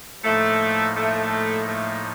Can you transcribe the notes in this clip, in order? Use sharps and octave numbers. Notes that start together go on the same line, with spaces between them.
A2 F3 A3 A#3 D#4
A3
A3